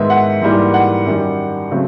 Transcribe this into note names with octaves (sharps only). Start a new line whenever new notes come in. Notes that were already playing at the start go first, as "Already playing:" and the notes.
Already playing: G#2 D#3 G#3 B3 E5
F#5
G#2 E3 G3 A#3
F#5
F#2 D#3 G3
C#3 F#3 A3 C4